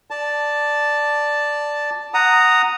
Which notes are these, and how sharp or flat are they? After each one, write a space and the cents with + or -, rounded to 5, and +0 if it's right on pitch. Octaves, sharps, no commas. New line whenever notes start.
D5 +0 A5 +0
F#5 +0 A#5 -10 D#6 +0